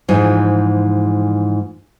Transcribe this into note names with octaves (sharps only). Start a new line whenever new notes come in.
G#2 E3 F3